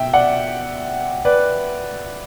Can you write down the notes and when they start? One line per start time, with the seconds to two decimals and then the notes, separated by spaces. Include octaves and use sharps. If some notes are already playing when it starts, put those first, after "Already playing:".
Already playing: B2 E5 G5
0.13 D5 F#5
1.25 B4 D5